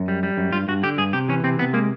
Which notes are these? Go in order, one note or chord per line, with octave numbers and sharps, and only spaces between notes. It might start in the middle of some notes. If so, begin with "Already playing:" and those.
Already playing: F#2
G3
G3
F#2
G2 F4
G2 F#4
D3 G4
G2 G#4
C3 G4
E3 C#4
C3 C4
C3 B3
G#3 A#3